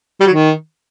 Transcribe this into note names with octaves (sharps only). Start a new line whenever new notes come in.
G3
F#3
D#3